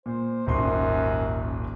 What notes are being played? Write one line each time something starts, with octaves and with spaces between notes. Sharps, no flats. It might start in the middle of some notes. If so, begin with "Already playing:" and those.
A#2 C5
D#1 G#1 F#2 C6